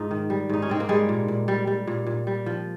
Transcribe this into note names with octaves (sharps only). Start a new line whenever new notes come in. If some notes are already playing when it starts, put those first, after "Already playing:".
Already playing: G#2 D#4 F4
D#3
G3
G#2 D#4
C#4
G#2 C4
A#3
G3 G#3
A#2
A#2
G3
G3
A#2
A#2
G3
F3